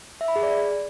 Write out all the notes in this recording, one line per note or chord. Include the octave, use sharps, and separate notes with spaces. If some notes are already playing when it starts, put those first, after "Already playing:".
E5
B5
G#4
D5